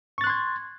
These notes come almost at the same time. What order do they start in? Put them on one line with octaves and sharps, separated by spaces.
C#6 A6 F#6 C6 G#6